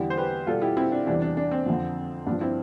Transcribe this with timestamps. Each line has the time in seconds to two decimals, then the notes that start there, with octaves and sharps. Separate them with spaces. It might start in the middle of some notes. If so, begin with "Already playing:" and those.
Already playing: E2 D3 G3 E4 G4
0.10 C5
0.17 G4 B4
0.47 B2 G3 F4 A4
0.62 E4 G4
0.77 C4 E4
0.92 D4
1.07 E2 C3 E3 G3 D4
1.22 D4
1.37 D4
1.51 C4
1.66 F2 D3 F3
2.26 G2 F3 D4
2.41 C4 E4